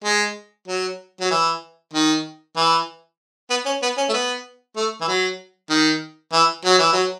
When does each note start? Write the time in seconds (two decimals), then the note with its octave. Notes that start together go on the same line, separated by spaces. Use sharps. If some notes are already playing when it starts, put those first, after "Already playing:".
0.04 G#3
0.68 F#3
1.21 F#3
1.31 E3
1.94 D#3
2.56 E3
3.50 B3
3.66 C#4
3.83 B3
3.98 C#4
4.09 A3
4.14 B3
4.76 A3
5.01 E3
5.08 F#3
5.70 D#3
6.33 E3
6.65 F#3
6.79 E3
6.93 F#3